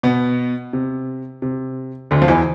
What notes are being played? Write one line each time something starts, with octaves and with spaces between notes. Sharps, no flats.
B2 B3
C3
C3
D2 D3
F3
E2 E3